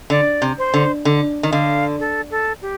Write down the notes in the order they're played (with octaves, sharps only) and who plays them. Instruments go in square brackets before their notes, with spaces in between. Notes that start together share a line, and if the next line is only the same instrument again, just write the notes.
[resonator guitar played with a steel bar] D3 [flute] D5
[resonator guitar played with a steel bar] C3
[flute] C5
[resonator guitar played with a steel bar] D3
D3
D#3
[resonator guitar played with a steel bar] D3 [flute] F5
[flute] A4
A4
G4